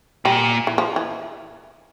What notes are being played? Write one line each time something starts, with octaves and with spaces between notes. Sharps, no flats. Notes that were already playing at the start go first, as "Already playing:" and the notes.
A#2 G3
E3
F3
E3